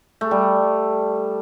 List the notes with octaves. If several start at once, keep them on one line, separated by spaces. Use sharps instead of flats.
A3
G3